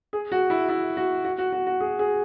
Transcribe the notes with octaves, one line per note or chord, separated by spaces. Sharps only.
G#4
F#4
E4
E4
F#4
F#4
F#4
F#4
F#4
G#4
G#4